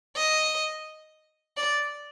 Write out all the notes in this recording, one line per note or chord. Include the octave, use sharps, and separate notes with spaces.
D#5
D5